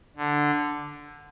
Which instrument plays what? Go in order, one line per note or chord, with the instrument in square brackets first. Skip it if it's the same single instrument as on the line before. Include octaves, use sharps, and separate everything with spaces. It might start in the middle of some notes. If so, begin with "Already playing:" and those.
[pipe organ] D3